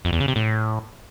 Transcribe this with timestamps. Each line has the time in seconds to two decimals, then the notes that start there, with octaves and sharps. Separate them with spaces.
0.05 F2
0.13 E2
0.20 C#3
0.28 C3
0.36 A2